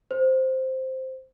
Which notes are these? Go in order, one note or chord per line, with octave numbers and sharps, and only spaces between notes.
C5